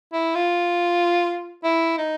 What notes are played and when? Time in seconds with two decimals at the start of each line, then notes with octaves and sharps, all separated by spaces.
0.13 E4
0.35 F4
1.64 E4
1.98 D#4